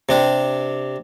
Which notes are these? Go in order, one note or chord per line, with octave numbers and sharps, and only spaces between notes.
C3 D4 G4